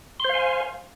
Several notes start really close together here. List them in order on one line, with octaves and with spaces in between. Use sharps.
C6 C5 F5 G#5